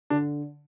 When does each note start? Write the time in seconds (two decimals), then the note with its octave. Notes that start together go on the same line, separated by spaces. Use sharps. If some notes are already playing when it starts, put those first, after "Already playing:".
0.10 D3 D4